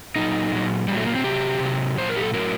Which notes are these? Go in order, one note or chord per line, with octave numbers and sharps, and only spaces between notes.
A#2 F#3 D#4
A#2 F#3
A#2 F#3 G3
A3
A#3
C4
C3 F#3 G4
C3 F#3
A#2 F#3 C5
A#4
G4
A4
A2 F#3 A#4